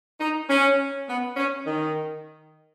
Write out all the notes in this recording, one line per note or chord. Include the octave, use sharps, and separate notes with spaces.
D#4
C#4
B3
C#4
D#3